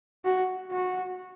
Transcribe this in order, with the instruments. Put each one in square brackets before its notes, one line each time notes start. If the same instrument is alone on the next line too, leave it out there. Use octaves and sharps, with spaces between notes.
[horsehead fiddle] F#4
F#4